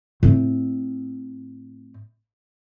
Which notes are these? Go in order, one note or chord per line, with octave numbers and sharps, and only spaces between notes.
A2 C4